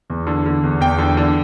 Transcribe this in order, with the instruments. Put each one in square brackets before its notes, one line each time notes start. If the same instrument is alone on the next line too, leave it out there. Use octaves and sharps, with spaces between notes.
[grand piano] E2
D3
D3
E2
E2 G5
D3
D3